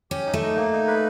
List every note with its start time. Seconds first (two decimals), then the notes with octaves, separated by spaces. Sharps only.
0.11 C#4 G4
0.26 D#4
0.34 A3
0.42 D#4
0.57 A#3
0.72 D#4
0.87 B4